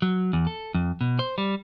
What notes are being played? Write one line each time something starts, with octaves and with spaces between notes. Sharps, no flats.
F#3
E2
A4
F2
B2
C5
G3